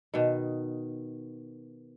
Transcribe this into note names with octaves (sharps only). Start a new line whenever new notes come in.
B2 D#3